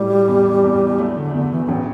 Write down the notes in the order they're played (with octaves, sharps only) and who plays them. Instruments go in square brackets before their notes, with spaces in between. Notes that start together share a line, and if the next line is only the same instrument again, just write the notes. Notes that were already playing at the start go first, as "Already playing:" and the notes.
Already playing: [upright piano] A2 F#3 [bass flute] G3
[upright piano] E2
E2
[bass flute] F#3 [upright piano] A3
[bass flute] D3
[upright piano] E2 [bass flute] D3
[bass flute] E3
E3
[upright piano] A1 [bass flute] F#3